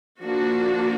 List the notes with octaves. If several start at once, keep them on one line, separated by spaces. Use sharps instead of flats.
F3 A#3 D4 F#4